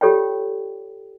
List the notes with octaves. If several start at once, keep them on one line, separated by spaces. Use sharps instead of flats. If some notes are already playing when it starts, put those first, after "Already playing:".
F4 G4 A4 C#5 D5 G5